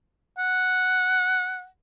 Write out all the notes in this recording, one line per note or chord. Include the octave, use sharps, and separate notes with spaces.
F#5